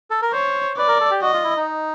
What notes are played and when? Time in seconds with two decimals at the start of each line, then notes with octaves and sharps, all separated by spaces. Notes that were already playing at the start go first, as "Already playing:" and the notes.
0.10 A4
0.22 A#4
0.33 C5 C#5
0.77 B4 D5
0.88 A#4
1.00 A4
1.11 G4
1.22 F#4 D#5
1.33 F4
1.44 E4
1.56 D#4